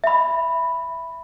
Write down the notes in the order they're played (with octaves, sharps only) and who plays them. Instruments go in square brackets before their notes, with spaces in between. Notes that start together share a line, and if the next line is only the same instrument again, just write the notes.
[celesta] E5 B5